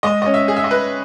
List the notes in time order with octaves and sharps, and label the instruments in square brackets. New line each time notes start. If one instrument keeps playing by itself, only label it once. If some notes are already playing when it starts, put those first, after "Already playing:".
[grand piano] G#3 [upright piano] D#5
[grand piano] C#4 [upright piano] D#5
[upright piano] E5
[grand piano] G#4
[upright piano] E5
D#5
[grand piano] B4